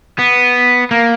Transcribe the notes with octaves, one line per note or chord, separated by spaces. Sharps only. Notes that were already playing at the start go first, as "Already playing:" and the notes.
B3
A#3